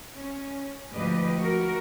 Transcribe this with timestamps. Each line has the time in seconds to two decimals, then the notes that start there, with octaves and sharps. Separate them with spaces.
0.15 C#4
0.93 D2 G#2 F3 G4 B4 D#5
1.39 F#4 A#4